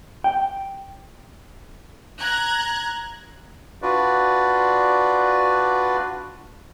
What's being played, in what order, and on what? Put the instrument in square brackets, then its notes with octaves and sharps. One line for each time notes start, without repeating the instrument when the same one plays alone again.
[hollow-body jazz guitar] G5
[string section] A#5 F#6 G#6
[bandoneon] D4 F4 F#4 B4 D5